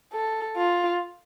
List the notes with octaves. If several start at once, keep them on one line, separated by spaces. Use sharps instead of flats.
A4
F4